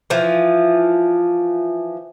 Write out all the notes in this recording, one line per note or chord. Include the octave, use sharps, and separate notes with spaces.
E3 F3